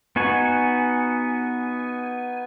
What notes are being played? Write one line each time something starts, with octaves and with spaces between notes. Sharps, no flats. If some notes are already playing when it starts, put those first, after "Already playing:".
B3 D#4 F#4 G#5